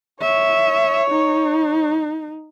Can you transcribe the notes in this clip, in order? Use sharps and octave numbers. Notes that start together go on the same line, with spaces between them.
C#5 E5
D#4